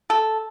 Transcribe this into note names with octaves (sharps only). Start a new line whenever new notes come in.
A4